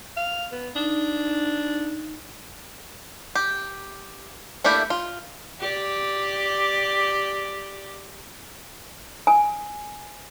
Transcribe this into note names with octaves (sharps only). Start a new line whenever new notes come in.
F5
B3
D4 D#4
G4
A3 A#3 D4 E4 G4
F4
G4 D5
G#5